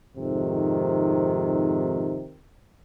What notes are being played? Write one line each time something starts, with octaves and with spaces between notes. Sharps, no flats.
F2 G#2 C3 D#3